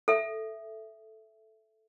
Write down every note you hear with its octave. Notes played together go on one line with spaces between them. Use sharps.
A4 E5